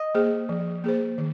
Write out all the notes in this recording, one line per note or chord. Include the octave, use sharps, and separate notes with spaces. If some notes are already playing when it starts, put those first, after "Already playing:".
Already playing: D#5
A#3 G#4 C5
F3
A#3 G#4 C5
D#3